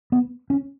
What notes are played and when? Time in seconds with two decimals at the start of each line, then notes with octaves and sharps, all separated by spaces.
0.12 B3
0.50 C#4